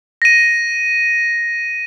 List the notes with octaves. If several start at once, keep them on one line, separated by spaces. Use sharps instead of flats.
A#6 D#7